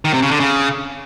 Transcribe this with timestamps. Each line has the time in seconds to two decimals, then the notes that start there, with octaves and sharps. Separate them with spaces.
0.05 D#3
0.13 C3
0.22 C#3
0.31 D3
0.40 C#3